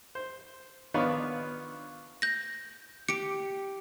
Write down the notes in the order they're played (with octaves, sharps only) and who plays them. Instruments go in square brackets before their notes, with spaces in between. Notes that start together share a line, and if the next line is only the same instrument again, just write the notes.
[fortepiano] C5
D#3 B3 D4 F4 B4 C#5
[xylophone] G6 A#6
[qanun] G4 [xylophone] C#7 D7